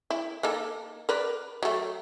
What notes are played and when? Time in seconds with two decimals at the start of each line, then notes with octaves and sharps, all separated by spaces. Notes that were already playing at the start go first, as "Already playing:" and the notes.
0.10 E4
0.43 A#3 D#4 A4
1.09 A#4 B4 D5
1.63 F#3 A3